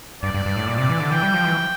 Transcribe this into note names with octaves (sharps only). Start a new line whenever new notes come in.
G2 D5
G2
G2
A2
A#2 D5
C3
E3
D3
E3 G5
G3
F3
E3